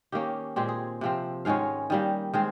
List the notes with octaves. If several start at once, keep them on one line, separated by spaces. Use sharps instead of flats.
D#3 A#3 C#4 G4
A#2 G#3 C4 G4
G#4
C3 F3 C4
G#2 D#3 G#3 C#4 F5
D#3 G3 A#3
D#3 G#3 C4